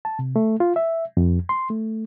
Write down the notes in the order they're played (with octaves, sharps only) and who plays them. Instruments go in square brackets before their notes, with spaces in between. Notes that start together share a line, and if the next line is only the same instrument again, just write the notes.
[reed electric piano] A5
C3
A3
F4
E5
F2
C6
A3